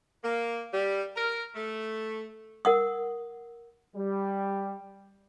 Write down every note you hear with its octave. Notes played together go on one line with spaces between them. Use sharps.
A#3
G3
A#4
A3
A#4 F#5 D#6
G3